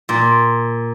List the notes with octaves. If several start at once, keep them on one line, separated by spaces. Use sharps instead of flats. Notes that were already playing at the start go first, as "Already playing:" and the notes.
A#2